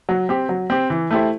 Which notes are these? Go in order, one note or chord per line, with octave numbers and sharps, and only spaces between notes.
F#3
C4 G4
F#3
C4 G4
E3
A3 E4 G4 C5